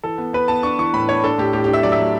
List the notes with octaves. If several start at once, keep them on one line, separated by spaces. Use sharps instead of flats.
E3 A4
B3
B3 B4
B3 A5
D4 C#6
E3 C#6
A2 B5
D4 C#5
D4 A4
A2 G4
A2 G4
G4
D4
E5
F#3 D5
E5
F#3